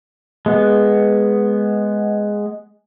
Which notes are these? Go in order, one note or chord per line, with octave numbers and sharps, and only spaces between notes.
G#3 B3